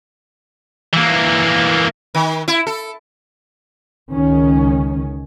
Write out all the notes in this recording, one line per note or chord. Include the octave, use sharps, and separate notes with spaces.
E3 A#3
D#3
E4
A4
C#2 D#3 C#4